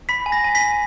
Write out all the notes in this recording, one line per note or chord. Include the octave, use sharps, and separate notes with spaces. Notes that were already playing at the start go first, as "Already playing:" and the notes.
B5 B6
G#5
A#6
G#5
B6
G#5